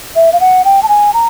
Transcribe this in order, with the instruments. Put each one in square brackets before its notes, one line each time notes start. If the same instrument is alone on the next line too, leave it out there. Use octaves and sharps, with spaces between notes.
[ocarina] E5
F5
F#5
G5
A5
G#5
A#5